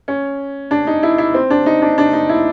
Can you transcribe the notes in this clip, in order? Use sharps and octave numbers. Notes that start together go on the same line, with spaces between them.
C#4
D4
D#4
E4
E4
C4
D4
D#4
D4
D4
D#4
E4